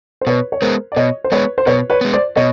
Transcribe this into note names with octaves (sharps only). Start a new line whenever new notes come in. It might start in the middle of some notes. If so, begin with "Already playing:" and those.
C5
B2 B4 C#5
C#5
G#3 B3 A#4 C5
D5
B2 C#5 D#5
C5
G#3 B3 B4 C#5
C5
B2 B4 C#5
B4 C#5
G#3 B3
C5 D5
B2 C#5 D#5